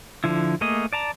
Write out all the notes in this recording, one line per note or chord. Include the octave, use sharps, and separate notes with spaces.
D3 F3 E4
A3 A#3 G#4 D#5
D5 A5 A#5